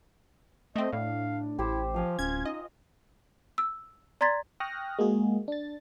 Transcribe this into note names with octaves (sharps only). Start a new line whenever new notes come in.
A3 C4 D#5
A2 D4 F5
A1 E4 G4 C5 E6
F3 F4 F5 G#5
D1 C#4 G#6
D#4 D#5
E6
D5 A#5 C6 G#6 A6 B6
G5 C#6 D#6 F6 F#6 A#6
G#3 A#3 F#4 G#4
D4 A6